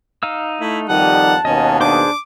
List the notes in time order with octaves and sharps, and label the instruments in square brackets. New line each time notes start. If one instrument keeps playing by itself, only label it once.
[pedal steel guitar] D#4 F5 E6
[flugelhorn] A3 [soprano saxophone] E4
[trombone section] F2 D#3 G3 [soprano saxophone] F#5 [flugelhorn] A5
[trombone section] D#2 B2 [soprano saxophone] C#4 [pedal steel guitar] D#5
[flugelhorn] D4 [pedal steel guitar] G#4 C5 [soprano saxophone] D6